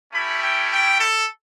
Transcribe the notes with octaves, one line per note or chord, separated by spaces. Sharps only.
A3 C#4 E4 G4 B5
G5
G5
A4